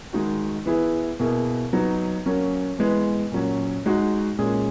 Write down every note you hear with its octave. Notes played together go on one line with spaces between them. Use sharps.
D#3 G#3 D#4 F#4
E3 B3 E4 G#4
B2 A#3 E4 G#4
F#3 B3 D#4
F#3 A#3 C#4
E3 G#3 B3
A#2 F#3 C#4
G#3 D#4 F#4
A#2 G#3 C#4 G#4